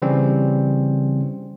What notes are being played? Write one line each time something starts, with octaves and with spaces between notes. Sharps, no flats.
C#3 E3 G3 C4 C#4